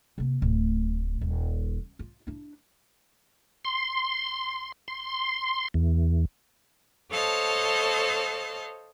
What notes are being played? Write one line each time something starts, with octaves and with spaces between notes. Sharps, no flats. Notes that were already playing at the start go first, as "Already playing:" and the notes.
C3 A#3
D1 A2
D#1
F4
D4 E4
C6
C6
E2
A4 C5 C#5 D#5 F5 A5